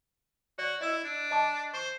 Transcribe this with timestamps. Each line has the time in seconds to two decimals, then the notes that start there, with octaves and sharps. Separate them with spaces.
0.59 F#4 D5
0.81 E4 D#5 E6
1.04 D4
1.31 D#5 A5 D6
1.74 C5 C#6